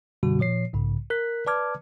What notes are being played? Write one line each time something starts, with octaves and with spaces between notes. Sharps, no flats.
F#2 B2 D3 G3 F#4
A#2 F3 C#5 C7
B1 G#2 C#3
A#4 F#6 B6
B4 D5 A5 D6 F6 G#6